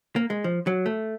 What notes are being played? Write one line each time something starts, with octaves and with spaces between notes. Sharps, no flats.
A#3
G#3
F3
F#3
A3